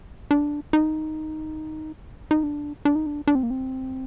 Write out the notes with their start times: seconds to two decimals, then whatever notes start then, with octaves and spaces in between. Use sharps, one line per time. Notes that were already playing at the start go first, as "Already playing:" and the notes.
0.31 D4
0.73 D#4
2.31 D#4
2.43 D4
2.85 D4
2.95 D#4
3.06 D4
3.27 D4
3.35 C4
3.43 A#3
3.50 C4